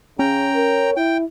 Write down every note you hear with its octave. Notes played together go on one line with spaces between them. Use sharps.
C#3 C#4 G5 A#5
A#4
E4 G5